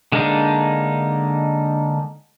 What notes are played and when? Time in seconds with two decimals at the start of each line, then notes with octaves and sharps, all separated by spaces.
0.12 D3 G#3 A#3 D4 D#4